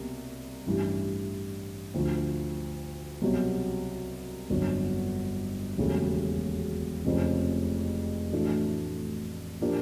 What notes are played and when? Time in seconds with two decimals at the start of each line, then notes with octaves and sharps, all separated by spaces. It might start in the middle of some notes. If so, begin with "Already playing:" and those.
Already playing: C2 B2 A#3
0.66 A1 G2 E3
1.94 D2 D3 F3
3.22 C2 B2 F#3
4.50 G1 F2 D3 F#3
5.77 E1 D#2 C#3 F#3 A3
7.05 F1 F2 C#3 F3
8.32 A2 E3 A3 D4 F#4
9.61 A#2 F3 A#3 D4 G4